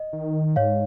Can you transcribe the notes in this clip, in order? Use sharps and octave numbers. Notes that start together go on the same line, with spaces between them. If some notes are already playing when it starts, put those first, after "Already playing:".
Already playing: D#5
D#3
G#2 C#5 F5